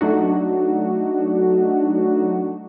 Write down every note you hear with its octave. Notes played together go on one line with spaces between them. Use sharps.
F#3 A3 D4 D#4 F#4